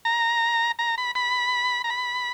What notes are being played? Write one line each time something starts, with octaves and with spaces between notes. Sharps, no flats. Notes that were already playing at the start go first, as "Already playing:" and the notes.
A#5
A#5
B5
B5
A#5
B5